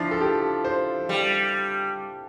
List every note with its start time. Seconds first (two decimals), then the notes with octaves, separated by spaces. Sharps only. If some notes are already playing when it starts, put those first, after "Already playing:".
Already playing: F3 D4 E4
0.11 A4
0.21 G4
0.64 C5
1.09 G3